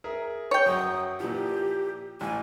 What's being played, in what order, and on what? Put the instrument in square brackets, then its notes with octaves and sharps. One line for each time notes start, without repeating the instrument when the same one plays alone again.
[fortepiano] G#4 A#4 E5
[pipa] C#5 G5
[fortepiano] F#2 A#5 [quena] D#6
[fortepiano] A#2 E3 F3 [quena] G4
[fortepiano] A1 A2 [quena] G#5